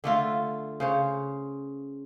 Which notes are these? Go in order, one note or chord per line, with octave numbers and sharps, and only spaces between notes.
D3 A3 F4
C#3 C5 C#5